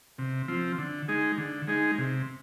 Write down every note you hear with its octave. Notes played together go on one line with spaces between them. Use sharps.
C3
F3 C4
D3
G#3 D#4 G#4
D3
G#3 D#4 G#4
C3